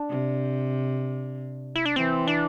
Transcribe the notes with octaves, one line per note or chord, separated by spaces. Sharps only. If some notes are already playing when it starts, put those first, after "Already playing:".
Already playing: D4
C3
E4
D4
E3 C4
D4